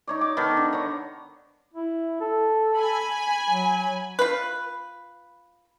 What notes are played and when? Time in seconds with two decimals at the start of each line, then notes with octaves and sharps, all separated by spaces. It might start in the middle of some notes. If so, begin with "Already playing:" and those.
0.07 D#4 C#5 D5
0.21 D6
0.37 D#3 B3 A4
0.57 D3
0.72 C#5 D5 A#5
1.74 E4
2.21 A4
2.76 G#5 B5
3.50 F#3
4.19 F4 B4